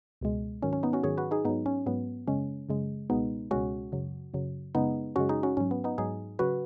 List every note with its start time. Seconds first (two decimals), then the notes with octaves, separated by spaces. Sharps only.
0.21 C#2 B2 G#3
0.62 G#2 D#3 F#3 C#4
0.73 C#4
0.83 B3 D#4
0.93 C#4 F#4
1.03 G#2 D#3 F#3 G#4 C#5
1.18 F#4 B4
1.31 D#4 G#4
1.45 G#2 F#3 B3 D#4
1.66 C#4
1.86 G#2 F#3 B3
2.27 F#2 C#3 G#3 C#4
2.69 F#2 C#3 G#3
3.10 C#2 B2 G#3 B3 D#4
3.51 C#2 B2 G#3 C#4 F#4
3.92 F#2 C#3 F#3
4.34 F#2 C#3 F#3
4.75 F#2 C#3 G#3 B3 D#4
5.16 F#2 C#3 G#3 C#4 F#4
5.29 D#4 G#4
5.43 C#4 F#4
5.57 G#2 F#3 C#4
5.71 B3
5.84 B3 D#4
5.98 G#2 F#3 D#4 G#4
6.39 C#3 F#3 F#4 B4